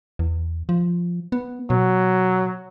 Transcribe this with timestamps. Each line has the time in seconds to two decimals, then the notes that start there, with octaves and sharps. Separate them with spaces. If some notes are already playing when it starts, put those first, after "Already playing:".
0.19 E2
0.69 F3
1.32 B3
1.70 B2 F#3